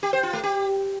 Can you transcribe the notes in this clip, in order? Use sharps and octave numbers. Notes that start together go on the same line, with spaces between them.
G4
C5
F4
A3
G4